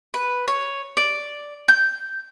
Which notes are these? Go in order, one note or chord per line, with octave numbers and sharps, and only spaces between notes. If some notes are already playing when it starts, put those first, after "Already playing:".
B4
C#5
D5
G6